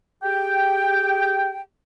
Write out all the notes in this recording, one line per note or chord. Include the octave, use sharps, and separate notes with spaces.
G4 G#4 G5